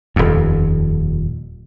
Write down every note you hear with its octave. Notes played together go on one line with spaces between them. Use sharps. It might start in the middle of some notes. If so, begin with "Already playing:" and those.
D#1 F2